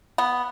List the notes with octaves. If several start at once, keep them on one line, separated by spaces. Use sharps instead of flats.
B3